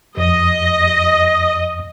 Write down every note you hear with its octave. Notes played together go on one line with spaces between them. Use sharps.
F2 D#5